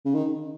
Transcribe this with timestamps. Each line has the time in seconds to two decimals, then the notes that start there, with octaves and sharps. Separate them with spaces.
0.05 C#3
0.14 D#3